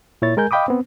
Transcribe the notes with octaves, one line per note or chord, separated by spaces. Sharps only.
A#2 E4 C#5 A6
G#3 A#4 G#5 G6
D#5 F5 G5 B5 D6 D#6
B3 C4